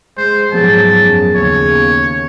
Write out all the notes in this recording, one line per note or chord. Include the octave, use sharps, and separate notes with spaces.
G#3 C5
G#2 F3 F#3 B3 G#4 A5
F#2
D#2 C#3 C#5